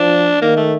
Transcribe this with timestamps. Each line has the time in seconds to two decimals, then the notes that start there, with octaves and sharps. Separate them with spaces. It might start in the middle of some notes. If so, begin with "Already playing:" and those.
Already playing: F3 D4
0.41 D#3 A#3
0.57 A3